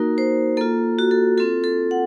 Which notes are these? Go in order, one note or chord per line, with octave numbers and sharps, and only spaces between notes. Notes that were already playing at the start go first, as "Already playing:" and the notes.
Already playing: A#3 D#4 F#4 A#4
C5
A#3 F4 A4
F#4
A4
C4 F4 A4
A4
F#5